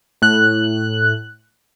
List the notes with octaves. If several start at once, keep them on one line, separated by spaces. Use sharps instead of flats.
A2 F#6